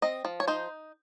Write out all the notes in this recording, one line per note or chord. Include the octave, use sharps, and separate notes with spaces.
C4 D#5
F3
C#5
D#4 C5